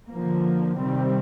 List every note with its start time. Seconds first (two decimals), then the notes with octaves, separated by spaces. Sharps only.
0.10 D3 F3 A#3
0.79 C3 D#3 G3 C4